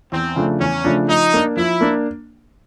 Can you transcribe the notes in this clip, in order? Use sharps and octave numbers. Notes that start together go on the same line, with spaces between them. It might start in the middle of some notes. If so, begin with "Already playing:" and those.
E2 C4
C#3 F3 A3 D4
E2 C#4
C#3 F3 A3 D4
F3 D#4
A#3 D4
F3 E4
A#3 D4